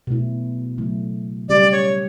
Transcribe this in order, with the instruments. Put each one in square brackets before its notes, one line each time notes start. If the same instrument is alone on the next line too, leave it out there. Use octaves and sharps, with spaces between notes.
[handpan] B2 A3 E4
C#3 F#3 A3 E4
[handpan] C#3 G3 C#4 G4 [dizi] D5
[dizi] C#5